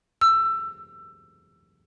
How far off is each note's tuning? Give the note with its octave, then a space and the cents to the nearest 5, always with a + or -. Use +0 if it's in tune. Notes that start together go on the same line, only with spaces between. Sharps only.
E6 +20